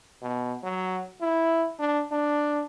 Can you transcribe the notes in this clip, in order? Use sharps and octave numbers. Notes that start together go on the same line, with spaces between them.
B2
F#3
E4
D4
D4